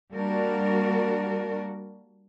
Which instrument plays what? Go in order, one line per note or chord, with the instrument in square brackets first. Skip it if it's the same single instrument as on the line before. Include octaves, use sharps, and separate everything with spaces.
[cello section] G3 A#3 D4 F#4 A#4